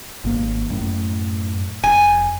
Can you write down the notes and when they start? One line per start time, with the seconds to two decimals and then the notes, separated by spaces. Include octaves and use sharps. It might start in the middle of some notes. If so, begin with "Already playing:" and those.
0.24 G#1 A#3
0.69 F#2 A2
1.84 F1 G#5